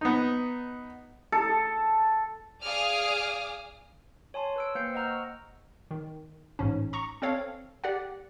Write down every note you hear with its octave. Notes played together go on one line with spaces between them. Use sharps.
B3 D#4
A4
G#4 D5 F5 D6 D#6 F6
C#5 G#5 A5 C6
B4 E6 D7
A#3 C5 G5 G6 C7 C#7
D#5 F#5 A#5 E6 F6
C#6
D#3
A1 G#2 C#4
A#5 C#6
C4 A4 C#5 F5
G4 D5 F#5